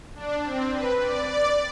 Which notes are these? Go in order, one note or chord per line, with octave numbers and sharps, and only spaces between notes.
D4
C4
B4
D5
D5